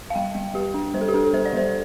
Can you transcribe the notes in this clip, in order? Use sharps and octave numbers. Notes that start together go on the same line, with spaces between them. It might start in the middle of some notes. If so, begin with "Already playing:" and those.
F5
G3 G5
G3
G3 G4
D4
G3 C5
A4
G4
D4 A4
G3 C5
D5
G3 C5